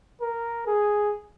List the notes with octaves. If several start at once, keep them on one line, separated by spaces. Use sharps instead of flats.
A#4
G#4